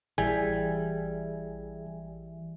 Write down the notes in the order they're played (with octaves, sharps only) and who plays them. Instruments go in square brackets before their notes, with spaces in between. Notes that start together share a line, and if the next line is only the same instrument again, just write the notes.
[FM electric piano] A1 E3 E5 [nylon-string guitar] G3 [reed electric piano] G#4 G#5 G#6